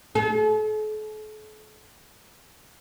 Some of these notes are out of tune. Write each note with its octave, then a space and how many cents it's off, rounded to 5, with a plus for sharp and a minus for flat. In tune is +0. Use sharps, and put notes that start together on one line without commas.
A4 -45